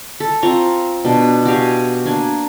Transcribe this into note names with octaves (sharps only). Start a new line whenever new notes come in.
A4
C4 F4 A#5 C#6
B2 D4
F#4 G4 F5 G#5
A#3 D4 G#5